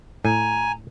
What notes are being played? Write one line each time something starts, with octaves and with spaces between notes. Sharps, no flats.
A2 G#5 A#5